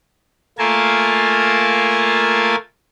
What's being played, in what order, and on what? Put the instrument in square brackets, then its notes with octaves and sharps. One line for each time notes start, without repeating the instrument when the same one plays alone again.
[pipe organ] A3 A#3 F4 A#4 G#5 A5